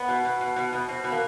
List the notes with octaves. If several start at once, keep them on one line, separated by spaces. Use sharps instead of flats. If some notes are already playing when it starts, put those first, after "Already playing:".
Already playing: B3
B2
B2
B2
B2
B2
B2 C4
B2
A#3